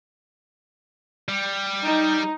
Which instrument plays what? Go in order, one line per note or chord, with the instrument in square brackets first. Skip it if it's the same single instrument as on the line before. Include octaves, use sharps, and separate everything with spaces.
[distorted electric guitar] G3
[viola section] D#4